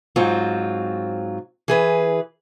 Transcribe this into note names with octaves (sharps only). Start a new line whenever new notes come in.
G#2 F#3 C4 F4
E3 G#4 B4